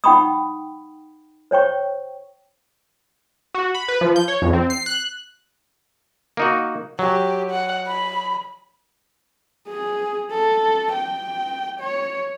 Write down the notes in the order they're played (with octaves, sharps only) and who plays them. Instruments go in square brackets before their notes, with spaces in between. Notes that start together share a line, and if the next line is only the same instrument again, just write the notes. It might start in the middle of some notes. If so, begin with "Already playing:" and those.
[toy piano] D#4 F#5 G5 B5 C#6 D#6
C5 C#5 G5 C#6
[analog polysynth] F#4
B5
B4
F3
G6
C#5
F2
C4
C7
F#6
[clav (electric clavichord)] A#3 D#4 F#4
[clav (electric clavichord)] F#3 [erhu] G4
[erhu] F#5
B5
[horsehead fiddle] G#4
A4
G5
C#5